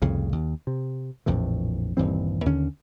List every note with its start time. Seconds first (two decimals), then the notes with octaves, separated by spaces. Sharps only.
0.02 C2 F2 A2 C#3
0.32 D#2
0.67 C3
1.26 A#1 F2 A2 E3
1.97 D#1 G2 E3 C4
2.46 D#2 D3 C#4